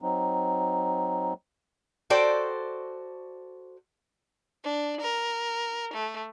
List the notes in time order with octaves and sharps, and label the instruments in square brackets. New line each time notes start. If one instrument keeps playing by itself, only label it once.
[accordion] F#3 C4 D#4
[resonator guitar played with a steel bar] F#4 A4 C5 D5 G5
[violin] D4
A#4
A3